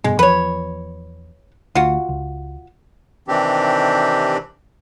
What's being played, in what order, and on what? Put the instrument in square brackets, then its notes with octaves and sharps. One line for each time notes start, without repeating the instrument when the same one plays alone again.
[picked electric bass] F1 G2 B2 [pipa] G#3
[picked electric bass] E2 F3 [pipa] B4 C#5
[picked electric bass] D2 [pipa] F4 F#4
[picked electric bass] C#2
[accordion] C3 D#3 E3 C4 D4 G4